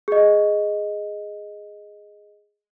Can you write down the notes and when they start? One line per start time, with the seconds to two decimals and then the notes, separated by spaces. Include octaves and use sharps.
0.08 G#4 D#5